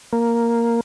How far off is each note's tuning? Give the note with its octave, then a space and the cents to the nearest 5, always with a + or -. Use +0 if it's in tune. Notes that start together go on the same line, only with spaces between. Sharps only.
A#3 +0